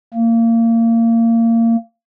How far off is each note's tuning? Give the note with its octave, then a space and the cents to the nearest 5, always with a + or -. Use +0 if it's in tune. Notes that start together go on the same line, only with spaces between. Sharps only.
A#3 -25